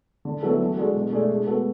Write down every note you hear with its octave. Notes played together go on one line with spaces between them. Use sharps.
D3
F#3 B3 E4 A4
E3
G#3 D4 F#4 A4
B2
A3 D4 G#4
G#3
B3 F#4 A4